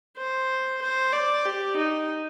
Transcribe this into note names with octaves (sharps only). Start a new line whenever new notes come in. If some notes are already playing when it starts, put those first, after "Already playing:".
C5
C5
D5
G4
D#4